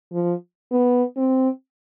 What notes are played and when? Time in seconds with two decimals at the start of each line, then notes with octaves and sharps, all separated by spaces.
0.12 F3
0.72 B3
1.17 C4